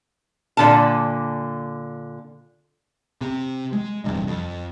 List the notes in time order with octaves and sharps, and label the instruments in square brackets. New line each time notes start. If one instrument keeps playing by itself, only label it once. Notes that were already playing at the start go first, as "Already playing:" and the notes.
[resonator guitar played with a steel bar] A#2 D3 A5
[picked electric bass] C3
G#3
D1 E2 G2 C3
F2